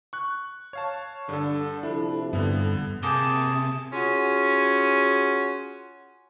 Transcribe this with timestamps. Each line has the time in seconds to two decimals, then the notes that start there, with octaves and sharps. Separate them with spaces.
0.13 C#6 F#6
0.73 C#5 F5 A5
1.29 G2 D3 A4
1.83 C3 F3 D4 E4 A4
2.33 G2 D3 B3
3.03 C3 A#3 G#4 A5 G6
3.93 C#4 F4 F#4 G#4